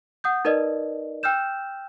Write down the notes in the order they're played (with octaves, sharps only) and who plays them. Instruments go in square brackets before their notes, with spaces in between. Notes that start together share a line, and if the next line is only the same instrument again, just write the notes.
[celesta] F#5 D#6 G6
D#4 A#4 B4 D5 D#5
G5 E6 F6 G6 E7